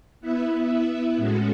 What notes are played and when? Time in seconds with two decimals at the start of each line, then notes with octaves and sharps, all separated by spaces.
0.20 B3 E4 B4 E5
1.17 A2 G#3 C#4 F#4 A4